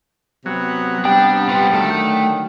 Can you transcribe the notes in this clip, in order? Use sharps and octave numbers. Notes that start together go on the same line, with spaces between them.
C3 F#3 B3
G3 D4 G5
F4 B4
D3 D#3 F#3 A3 A5